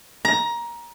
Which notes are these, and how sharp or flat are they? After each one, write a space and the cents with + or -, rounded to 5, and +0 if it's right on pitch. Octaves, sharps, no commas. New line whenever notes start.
A#5 +20